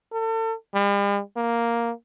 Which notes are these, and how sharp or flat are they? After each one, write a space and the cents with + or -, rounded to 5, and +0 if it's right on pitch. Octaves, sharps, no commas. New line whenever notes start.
A4 +35
G3 +45
A#3 +5